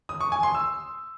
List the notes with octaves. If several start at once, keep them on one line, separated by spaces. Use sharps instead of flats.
D#6
C#6
G#5
C6
E6